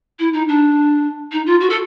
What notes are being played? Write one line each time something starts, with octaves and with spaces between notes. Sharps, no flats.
E4
D#4
D4
D#4
F4
F#4
A4